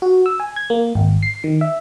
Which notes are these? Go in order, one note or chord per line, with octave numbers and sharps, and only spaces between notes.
F#4
E6
G#5
G#6
A#3
G#1
C7
D#3
E5